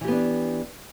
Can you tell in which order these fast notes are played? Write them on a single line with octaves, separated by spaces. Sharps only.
E3 G4 B3 D4